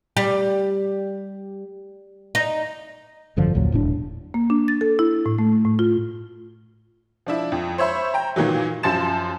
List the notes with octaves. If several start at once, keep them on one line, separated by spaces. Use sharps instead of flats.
G3
D#4
G#1 F#2 D3 F3
A#1 D#2 A#2 F#3
E1 A2 D4
A#3
D4
A6
A4
E4
A2
A3
A2
F4
F3 D4 E4
F2
C5 C#5 E5 B5 C6
G5 A#5
A#2 D#3 E3 F#3
F#2 F3 A5 C6 A6 E7